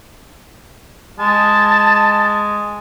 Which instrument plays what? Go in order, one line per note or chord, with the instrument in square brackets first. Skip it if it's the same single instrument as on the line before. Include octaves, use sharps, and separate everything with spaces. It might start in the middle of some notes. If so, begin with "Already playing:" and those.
[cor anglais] G#3 [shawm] A5